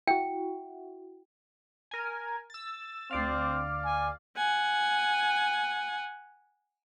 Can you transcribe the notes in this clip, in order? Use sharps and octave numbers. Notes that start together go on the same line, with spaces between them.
E4 F#4 G5
A#4 G#5
E6 A6
D2 C4 D5 F5
G#5
F#5 G#5